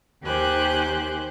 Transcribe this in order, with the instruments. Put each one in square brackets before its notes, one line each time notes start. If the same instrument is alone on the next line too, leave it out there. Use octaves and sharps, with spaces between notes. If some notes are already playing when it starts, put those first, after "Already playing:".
[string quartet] D#2 D#3 G4 C5 G#5 F#6